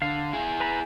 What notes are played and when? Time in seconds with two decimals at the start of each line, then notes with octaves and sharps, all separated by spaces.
0.02 D3 F5
0.33 E4 G#4
0.60 B4 A#5 B5